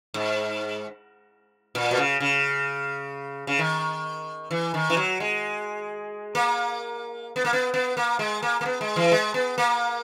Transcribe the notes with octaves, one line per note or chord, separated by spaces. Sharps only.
G#2
A#2
B2
C#3
C#3
C#3
D#3
E3
D#3
E3
F#3
G#3
A#3
B3
A#3
B3
B3
A#3
G#3
A#3
A#3
B3
G#3
E3
G#3
B3
A#3